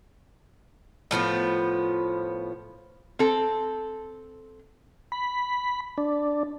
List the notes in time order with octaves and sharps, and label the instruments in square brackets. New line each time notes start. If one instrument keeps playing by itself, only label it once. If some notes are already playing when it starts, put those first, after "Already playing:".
[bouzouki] A2 F3 B3 F4
[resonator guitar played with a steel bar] C4 A4
[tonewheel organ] B5
D4